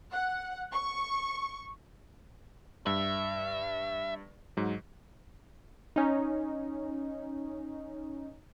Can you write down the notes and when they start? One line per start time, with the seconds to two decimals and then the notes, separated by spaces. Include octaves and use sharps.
0.13 F#5
0.73 C#6
2.87 G2 E5
4.57 G#2 F#3
5.96 C#4 D#4